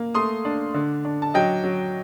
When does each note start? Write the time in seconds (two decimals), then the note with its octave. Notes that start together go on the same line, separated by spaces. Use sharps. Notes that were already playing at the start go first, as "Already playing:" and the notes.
Already playing: A#3
0.14 A3 C6 D#6
0.45 D4
0.74 D3
1.05 D4
1.22 A5
1.34 F#3 D#5 G5
1.64 F#3